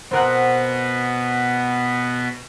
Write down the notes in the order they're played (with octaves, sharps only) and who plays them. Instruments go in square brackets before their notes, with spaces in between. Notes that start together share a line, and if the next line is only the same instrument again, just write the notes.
[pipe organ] B2 B3 [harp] C4 A#4 F#5